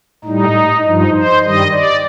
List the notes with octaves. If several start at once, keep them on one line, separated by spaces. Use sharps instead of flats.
A2 G3 D#4
G2 F3 D#4
C5
G2 D#3 G3 D#5
D5